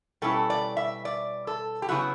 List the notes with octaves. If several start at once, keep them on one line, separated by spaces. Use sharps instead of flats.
B2 G3 C#4 E4 A4
D5
E5
D5
A4
G4
C#3 F#3 B3 E4 F#4